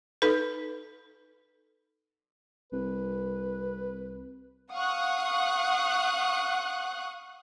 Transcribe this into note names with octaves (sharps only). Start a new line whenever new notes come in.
D#4 A4 B4
C2 B4
F5 F#5 C#6 D#6 F#6